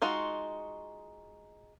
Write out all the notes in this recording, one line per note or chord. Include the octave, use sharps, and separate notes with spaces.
G#3 D#4 F4 F#4